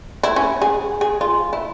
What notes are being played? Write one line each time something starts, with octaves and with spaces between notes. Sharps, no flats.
E4
C#4
G#4
G#4
F4
E4